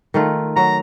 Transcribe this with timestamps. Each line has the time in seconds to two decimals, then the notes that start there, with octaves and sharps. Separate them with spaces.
0.14 D#3 A3 F4
0.56 F#3 A#5